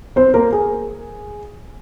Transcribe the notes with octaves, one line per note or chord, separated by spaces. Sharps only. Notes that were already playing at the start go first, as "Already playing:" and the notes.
C4 C5
A#3 A#4
G#4